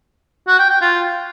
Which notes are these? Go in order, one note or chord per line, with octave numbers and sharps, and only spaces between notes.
F#4
G5
G5
F4